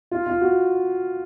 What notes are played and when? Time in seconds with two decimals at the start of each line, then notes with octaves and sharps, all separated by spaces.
0.11 F4
0.26 F4
0.41 F#4